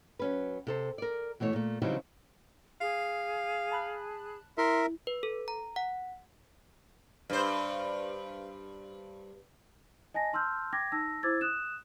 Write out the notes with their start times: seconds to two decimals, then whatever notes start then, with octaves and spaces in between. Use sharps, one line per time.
0.19 F#3 C#4 B4
0.67 C3 A4 C5
0.98 A#4 D5
1.40 B2 E3 A3 C#5
1.53 A#2 A3
1.82 C#3 E3 F#3 G3 C4 D#4
2.81 G#4 F5
3.72 A5 B5 F#6
4.58 E4 A#4 E5 C6
5.07 B4
5.23 A4
5.48 A#5
5.76 F#5
7.30 G2 C5
10.14 D#5 G#5 A5 A#6
10.33 A5 C6 E6 F6 G6
10.73 G5 D6 G#6 A#6
10.92 D#4 A5 E6 A#6
11.23 E4 C5 D6 E6 G#6 A6
11.41 D#6 F#6 E7